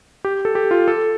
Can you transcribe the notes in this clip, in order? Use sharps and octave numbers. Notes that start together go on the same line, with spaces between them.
G4
A4
G4
F4
A4